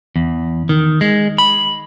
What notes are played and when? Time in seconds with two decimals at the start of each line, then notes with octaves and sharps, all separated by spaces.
0.16 E2
0.69 D#3
1.01 G#3
1.38 B5